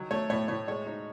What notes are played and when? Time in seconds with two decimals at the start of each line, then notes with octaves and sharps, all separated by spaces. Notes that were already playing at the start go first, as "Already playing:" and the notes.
Already playing: D#3 F#3
0.11 A3 C#5
0.29 A2 C#5
0.48 A2 C#5
0.68 G#3 C#5
0.86 D#4